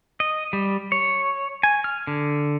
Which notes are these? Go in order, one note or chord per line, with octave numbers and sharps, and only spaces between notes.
D#5
G3
C#5
G#5
F6
D3